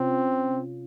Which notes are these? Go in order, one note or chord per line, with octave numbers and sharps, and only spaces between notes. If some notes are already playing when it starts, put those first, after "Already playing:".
Already playing: C3 C4 C#4 F4